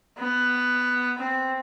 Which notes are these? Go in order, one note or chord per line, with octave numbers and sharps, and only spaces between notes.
B3
C4